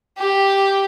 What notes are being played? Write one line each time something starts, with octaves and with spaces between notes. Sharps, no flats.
G4